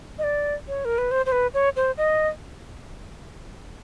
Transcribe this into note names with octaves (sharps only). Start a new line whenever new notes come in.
D#5
D5
C#5
A#4
B4
C5
C5
B4
C#5
C5
D#5